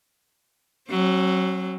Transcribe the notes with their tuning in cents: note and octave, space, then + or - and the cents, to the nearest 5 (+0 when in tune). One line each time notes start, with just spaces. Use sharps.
F#3 +15 C#4 -45